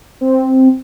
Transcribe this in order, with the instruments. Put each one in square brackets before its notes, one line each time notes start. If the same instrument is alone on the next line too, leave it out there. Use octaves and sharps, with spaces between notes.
[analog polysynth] C4